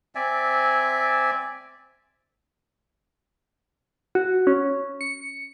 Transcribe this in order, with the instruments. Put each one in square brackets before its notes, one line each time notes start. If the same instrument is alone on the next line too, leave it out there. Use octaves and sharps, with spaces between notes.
[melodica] C4 D5 E5 G#5
[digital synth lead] F#4
C#4
C#7